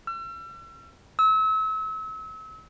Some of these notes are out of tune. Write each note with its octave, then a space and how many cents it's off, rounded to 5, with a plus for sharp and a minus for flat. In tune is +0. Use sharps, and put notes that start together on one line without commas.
E6 +45
E6 -35